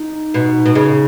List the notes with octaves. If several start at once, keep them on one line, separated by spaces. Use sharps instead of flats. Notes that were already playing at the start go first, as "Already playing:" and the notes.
Already playing: D#4
B2
B2
C#3